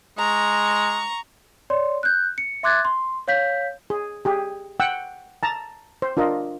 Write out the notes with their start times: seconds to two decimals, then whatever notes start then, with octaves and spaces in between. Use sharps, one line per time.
0.18 G#3 A#5 C#6
1.70 C#5 D5 C6
2.03 F#6 G6
2.38 C#7
2.63 E5 C6 D6 F#6 G#6 A6
2.85 C6
3.28 C#5 F5 G6 B6
3.90 G#4
4.25 G4 G#4
4.80 F#5 G5 E6
5.43 A5 A#5
6.02 C5
6.17 D4 F4 A#4 D#5